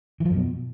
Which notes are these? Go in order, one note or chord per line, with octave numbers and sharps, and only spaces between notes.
E3
F3
F#2
B2